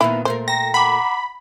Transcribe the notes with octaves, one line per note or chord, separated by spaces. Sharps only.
A#2 D#3 B3 E4
A#2 A3 A#4 C5
G5 A#5 A#6
F#5 A#5 B5 D6